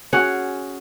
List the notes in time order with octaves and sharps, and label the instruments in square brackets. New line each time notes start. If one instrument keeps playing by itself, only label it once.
[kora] C#4 F#4 G#4 F#5